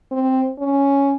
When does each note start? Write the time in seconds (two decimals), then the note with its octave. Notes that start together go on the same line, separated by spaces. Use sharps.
0.12 C4
0.59 C#4